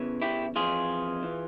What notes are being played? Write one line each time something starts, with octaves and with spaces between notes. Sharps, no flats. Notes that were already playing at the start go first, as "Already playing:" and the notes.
Already playing: E2 C#3 E3
E4 G4
F2 E3 F4 G#4
E3